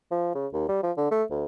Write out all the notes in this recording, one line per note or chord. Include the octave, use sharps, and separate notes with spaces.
F3
C#3
D#2
G3
F3
D3
A3
D2